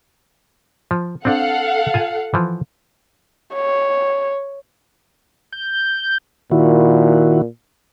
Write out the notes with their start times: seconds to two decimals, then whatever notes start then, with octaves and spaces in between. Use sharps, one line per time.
0.91 F3
1.25 C4 D4 A4 F5 F#5
1.94 F4 G#5 A5
2.34 E3 F3
3.54 C#5
5.53 G6
6.51 A#2 D#3 E4 F#4